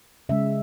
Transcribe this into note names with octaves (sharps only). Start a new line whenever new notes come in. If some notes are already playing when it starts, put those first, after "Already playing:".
C#3 G#3 E5